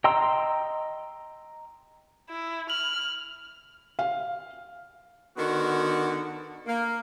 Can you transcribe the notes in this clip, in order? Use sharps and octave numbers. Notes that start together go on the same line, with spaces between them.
D#5 G5 A#5 C6 E6
E4
F6 F#7
F5
D3 D#3 B3 F#4
A#3